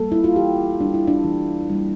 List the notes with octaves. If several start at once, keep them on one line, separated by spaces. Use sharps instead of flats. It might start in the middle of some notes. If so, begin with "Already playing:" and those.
Already playing: G3 A#3 A4
E4
F4
E3 G4
G3 A#3 D4
E4
D4
E3
G3 A#3